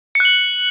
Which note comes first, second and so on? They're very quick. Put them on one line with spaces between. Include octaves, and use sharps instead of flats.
C#7 F#6 F#7